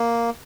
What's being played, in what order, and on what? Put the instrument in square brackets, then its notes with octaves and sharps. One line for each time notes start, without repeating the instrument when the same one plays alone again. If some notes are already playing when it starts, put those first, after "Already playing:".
Already playing: [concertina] A#3